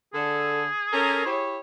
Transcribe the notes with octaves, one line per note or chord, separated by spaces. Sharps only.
D3 G#4 A4
C#4 A4 A#4
E4 G4 C#5